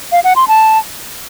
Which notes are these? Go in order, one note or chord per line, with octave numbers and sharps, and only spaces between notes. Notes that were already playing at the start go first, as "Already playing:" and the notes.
F5
F#5
C6
A5